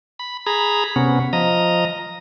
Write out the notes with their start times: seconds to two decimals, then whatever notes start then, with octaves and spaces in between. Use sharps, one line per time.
0.19 B5
0.46 G#4 A#5 B5
0.96 C3 B3 C#4
1.33 F3 D#5 A#5